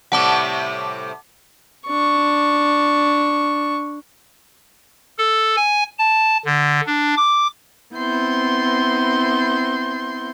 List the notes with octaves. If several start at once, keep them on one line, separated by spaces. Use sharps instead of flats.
A2 C3 G3 F#5 A5 D6
D4 C#6
A4
G#5
A5
D3
D4
D6
B3 C4 E4 C6 G6